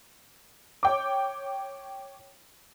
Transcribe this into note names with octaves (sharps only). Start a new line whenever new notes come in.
C#5 G5 D6